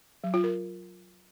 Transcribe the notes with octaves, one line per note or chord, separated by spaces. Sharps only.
F#3
F4
A#4